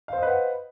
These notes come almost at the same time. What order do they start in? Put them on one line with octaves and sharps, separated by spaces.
F5 C5 D#5 B4 F#5